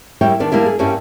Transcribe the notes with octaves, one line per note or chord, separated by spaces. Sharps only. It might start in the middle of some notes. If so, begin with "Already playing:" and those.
G3 A#3 E4 C#5 E5 G5
D#3 B3 D4 D5
G3 A#3 D4 E4 G4
G#4
G2 G3 A#3 C#4 E4